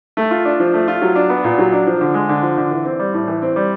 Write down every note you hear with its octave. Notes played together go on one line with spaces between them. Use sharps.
A3
F4
D4
F3
A3
F4
F#3
D4
B3
A#2
F#3
D4
F3
D3
G#3
D3
F3
D3
E3
C4
G3
A2
E3
C4
G3